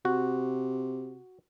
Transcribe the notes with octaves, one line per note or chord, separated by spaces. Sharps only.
C3 F#4